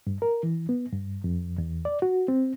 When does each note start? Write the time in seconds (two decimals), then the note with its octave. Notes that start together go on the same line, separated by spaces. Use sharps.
0.07 G2
0.22 A#4
0.43 E3
0.69 B3
0.93 G2
1.24 F2
1.58 E2
1.85 D5
2.02 F#4
2.28 C4